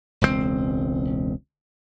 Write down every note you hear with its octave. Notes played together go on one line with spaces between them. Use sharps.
E1 C#2 C3 C4